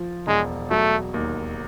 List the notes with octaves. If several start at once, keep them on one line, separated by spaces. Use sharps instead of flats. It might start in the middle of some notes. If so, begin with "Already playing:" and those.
Already playing: F3
E1 G#3
F#3 A3
D#2